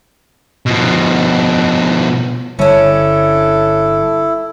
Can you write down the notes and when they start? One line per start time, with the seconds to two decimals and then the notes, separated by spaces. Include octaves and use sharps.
0.66 B2 F3
2.59 G1 D3 G3 C#4 D4 E4 A4